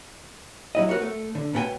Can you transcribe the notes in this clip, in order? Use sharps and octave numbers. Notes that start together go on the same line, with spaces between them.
F#3 E4 D#5
B3 F#4 A#4 C#5
A3
D3
C#2 B2 B3 E4 G5 G#5